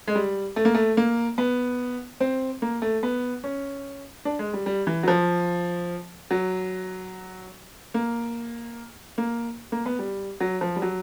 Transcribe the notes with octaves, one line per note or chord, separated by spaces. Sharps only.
G#3
G3
A3
A#3
A3
A#3
B3
C4
A#3
A3
B3
C#4
D4
G#3
G3
G3
E3
F#3
F3
F#3
A#3
A#3
A#3
B3
G3
F#3
F3
G3
F#3